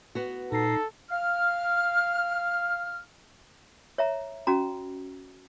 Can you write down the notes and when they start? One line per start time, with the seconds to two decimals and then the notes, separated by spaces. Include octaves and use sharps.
0.15 B3 F#4
0.52 A#2 D#4 A4 C7
1.11 F5 F6
3.98 C#5 E5 A#5
4.47 C#4 F#4 A#5